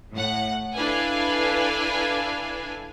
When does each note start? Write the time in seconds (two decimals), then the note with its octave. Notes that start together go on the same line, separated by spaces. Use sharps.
0.12 A2 F#5
0.74 D4 E4 A4 B4 F5 G#5